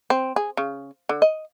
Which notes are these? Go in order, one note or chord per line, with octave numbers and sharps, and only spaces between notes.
C4
G#4
C#3
D3
D#5